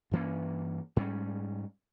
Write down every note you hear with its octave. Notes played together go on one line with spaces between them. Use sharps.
G2 E3 A#3 C#4
G#2 G3 C#4